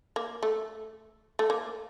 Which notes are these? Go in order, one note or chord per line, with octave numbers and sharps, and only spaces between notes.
A#3
A3
A3
A#3